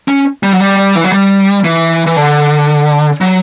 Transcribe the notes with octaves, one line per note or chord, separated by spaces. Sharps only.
C#4
G3
F#3
G3
E3
F#3
G3
E3
E3
D3
F#3